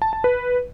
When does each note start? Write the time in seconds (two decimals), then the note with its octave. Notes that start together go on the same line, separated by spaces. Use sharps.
0.02 A5
0.13 A5
0.24 B4